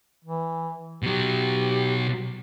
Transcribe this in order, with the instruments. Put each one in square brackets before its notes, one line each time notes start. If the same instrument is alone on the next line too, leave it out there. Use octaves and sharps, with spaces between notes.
[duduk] E3
[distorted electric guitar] B2 F#3 [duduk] G4